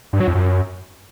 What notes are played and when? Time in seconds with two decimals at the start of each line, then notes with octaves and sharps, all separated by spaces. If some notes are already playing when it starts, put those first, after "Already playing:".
0.13 G2
0.20 F#3
0.27 F2
0.35 F#2